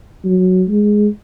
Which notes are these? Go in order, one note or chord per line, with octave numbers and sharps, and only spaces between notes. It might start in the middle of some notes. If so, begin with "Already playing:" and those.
F#3
G#3